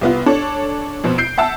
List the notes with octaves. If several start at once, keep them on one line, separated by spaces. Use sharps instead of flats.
C2 B3 F4
D4 A4 C#5
F2 B2 C5
G6 C7 D7
E5 F#5 A5 E6